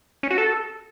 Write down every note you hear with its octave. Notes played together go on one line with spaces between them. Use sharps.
C#4
F#4
A4